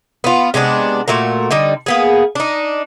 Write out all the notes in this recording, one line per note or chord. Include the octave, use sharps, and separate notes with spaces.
B3 F4
C3 G#3 B3 D4
A#2 A3 F#4 A#4
D3 G3 D#4
A#3 B3 G#4
D4 D#4